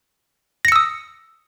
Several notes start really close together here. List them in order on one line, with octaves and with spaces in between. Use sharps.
A#6 C#7 E6 D#6